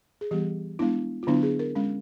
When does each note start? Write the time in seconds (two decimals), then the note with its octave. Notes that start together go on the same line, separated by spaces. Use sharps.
0.21 G#4
0.31 E3 G3 B3 G4
0.79 G#3 B3 D4 E4
1.23 F4
1.27 D3 F#3 B3 D4 E4
1.43 G#4
1.59 A#4
1.75 G#3 C#4